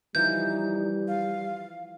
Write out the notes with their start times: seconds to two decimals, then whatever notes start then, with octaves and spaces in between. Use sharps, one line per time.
0.15 E3 F3 G3 D#4 G6
1.08 F5